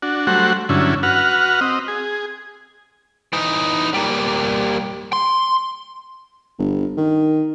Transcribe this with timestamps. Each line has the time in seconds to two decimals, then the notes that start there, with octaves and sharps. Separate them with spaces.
0.02 D4 F#4
0.27 F#3 G3 A3 F#4 C5 F#5
0.69 G2 D3 F#3 C#4 E4
1.03 F#4 B4 F#5 F6
1.61 C4 D#5
1.88 G#4
3.33 E3 D#4
3.94 G3 A#3
5.13 C6
6.58 G1
6.97 D#3